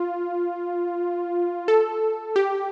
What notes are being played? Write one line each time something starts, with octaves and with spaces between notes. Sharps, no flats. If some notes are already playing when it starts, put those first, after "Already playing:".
Already playing: F4
A4
G4